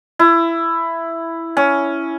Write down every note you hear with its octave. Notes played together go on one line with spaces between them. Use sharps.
E4
C#4